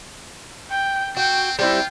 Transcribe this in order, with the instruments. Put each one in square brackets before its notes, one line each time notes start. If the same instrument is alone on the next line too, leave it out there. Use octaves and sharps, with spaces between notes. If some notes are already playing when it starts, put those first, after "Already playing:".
[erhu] G5
[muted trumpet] C4 [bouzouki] F#4 [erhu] G5
[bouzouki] G3 C4 E4 [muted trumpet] F4 [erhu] G5